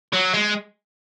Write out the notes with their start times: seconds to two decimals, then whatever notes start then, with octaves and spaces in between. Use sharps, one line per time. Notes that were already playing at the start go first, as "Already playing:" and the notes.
0.13 F#3
0.34 G#3